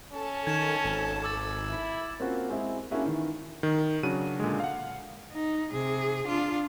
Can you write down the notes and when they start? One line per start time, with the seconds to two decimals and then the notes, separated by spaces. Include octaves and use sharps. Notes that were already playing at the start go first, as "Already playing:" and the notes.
0.13 C#4 A4 A5
0.47 D#3 G#6 E7
0.85 G#1
1.23 D6 E6 A6
1.69 E4
2.20 A#3 C4 C#4 F4 F#4
2.49 G#3 C4 E4 G#4
2.91 A#3 C#4 D4 E4 F#4 G#4
3.06 D#3 E3
3.63 D#3
4.03 C#3 F#3 D4 F#4 D#7
4.40 A#2 D3 G#3
4.60 F5 F#5
5.33 D#4
5.73 C3 G#4
6.27 D4 F4